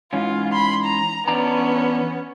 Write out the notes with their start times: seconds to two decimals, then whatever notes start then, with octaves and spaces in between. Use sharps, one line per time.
0.13 G#2 E3 C#4 F4
0.52 B5 C6
0.84 A#5
1.28 E2 B3 C#4 D4 A#5